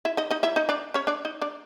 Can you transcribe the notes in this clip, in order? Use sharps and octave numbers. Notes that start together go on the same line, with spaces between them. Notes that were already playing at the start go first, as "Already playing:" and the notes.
E4 E5
D#4 D#5
D#4 D#5
E4 E5
D#4 D#5
D4 D5
C#4 C#5
D4 D5
D#4 D#5
D4 D5